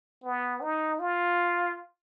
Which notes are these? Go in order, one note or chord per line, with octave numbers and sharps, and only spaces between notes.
B3
D#4
F4